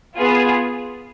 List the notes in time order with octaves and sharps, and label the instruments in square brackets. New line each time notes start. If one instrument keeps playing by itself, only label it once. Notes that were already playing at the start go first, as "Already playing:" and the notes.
[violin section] B3 F4 G#4